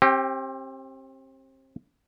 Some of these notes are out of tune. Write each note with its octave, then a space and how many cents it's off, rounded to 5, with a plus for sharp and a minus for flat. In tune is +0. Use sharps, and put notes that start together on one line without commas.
C4 +30 G4 +0